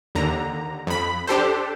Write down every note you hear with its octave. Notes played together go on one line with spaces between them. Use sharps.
D#2 D3 A#5
F2 B5
D4 G4 A4 C5